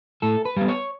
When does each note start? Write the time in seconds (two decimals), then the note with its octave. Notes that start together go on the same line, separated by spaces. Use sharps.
0.22 A2 A4
0.45 B4
0.57 G3 B3
0.68 C#5